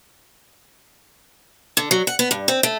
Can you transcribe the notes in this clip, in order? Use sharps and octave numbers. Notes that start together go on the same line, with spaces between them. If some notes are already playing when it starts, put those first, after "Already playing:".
D3
F#3
F#5
B3
G2
C4
A3